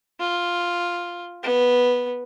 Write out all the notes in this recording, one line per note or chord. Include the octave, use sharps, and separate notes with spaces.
F4
B3